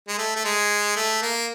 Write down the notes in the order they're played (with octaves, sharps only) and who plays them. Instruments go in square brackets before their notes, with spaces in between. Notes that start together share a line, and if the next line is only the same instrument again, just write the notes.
[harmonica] G#3
A3
A3
G#3
A3
A#3